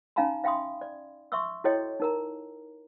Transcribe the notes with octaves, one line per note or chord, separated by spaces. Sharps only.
C#4 D#4 F5 G#5 A#5 B5
E5 F5 G5 B5 C6 D#6
D5
E5 C6 C#6 D#6 E6
E4 F#4 A4 C#5 D#5 G5
D#4 A#4 A#5